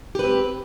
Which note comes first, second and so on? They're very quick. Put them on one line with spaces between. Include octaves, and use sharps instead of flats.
G4 B4 C4